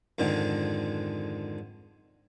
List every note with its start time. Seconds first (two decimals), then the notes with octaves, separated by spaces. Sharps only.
0.19 F2 G#2 D3 D#3 G#3